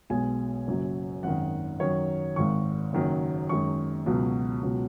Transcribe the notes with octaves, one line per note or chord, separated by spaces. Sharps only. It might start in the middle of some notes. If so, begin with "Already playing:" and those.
B1 B2 G#3 G#5
F#1 F#2 F#3
G#1 F#2 D#3 F#5
F#2 D#3 F#3 C#5
G#1 G#2 D#3 C#6
F#1 F#2 D#3 F#3
F#2 D#3 G#3 C#6
C#2 B2 F#3
C#2 B2 F#3